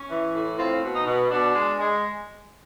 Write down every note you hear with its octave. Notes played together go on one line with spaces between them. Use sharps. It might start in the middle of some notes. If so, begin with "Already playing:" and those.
Already playing: C#4
E3
A2
C4 F4
B2
D#4
B2
B2 D4
G#3
G#3